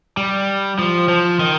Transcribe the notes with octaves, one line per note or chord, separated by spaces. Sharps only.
G3
F3
F3
D#3